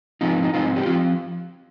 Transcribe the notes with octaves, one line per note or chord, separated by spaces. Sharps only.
G#2 F3 C4 D#4 F4
D#4
G#2 F3 C4 D#4 F4
G3 G4
F3 C4 F4